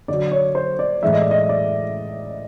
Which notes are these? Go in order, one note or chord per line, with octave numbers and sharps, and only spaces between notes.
D3 F#3 D5
C#5
C5
D5
A2 E3 G#3 E5
D#5
D5
D#5
D5